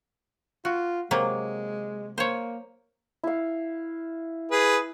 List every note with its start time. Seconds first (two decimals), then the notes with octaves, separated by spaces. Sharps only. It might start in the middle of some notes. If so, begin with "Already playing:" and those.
0.65 F4 F#4
1.11 C3 F#3 G#3 A#3
2.18 A#3 C5 C#5
3.24 E4 F5
4.51 G#4 B4